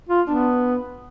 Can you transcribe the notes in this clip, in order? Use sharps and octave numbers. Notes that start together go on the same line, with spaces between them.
F4
B3 D4